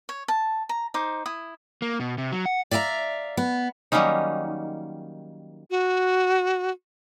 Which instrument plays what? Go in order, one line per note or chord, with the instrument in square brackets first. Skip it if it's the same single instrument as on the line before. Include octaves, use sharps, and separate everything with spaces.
[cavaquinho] C#5
A5
A#5
D#4 C5 D6
E4 D#6
[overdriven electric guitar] A#3
B2
C3
F#3
F#5
[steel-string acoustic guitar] D5 E5 F5 G5 A#5
B3
[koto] D#3 F#3 G3 A#3 C#4 D#4
[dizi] F#4